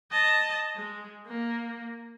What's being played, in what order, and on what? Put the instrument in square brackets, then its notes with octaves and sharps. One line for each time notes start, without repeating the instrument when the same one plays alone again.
[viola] D#5 A5
G#3
A#3